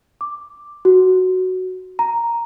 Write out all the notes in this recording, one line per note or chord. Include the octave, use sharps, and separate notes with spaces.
D6
F#4
A#5